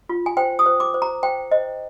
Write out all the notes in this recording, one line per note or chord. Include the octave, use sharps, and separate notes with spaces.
F4
G#5
C5 G5
D#6
C5
D6
C5
A#5
C5 G5
C5 D#5